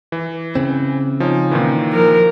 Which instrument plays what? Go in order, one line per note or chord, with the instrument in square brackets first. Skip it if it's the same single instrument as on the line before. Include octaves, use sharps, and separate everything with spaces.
[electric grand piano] E3
[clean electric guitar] C#3 C4
[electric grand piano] F3 C#4 D#4
A#2 D#3 E3
[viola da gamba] F3 A#4